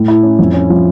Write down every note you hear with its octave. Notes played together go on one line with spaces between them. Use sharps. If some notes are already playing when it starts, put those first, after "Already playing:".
Already playing: A2
E4
C#4
F2
C#4
F3